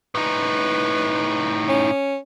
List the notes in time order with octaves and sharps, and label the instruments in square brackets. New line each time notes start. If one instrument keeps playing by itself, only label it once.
[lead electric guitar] A2 D#4 [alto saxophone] B4
[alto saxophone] C#4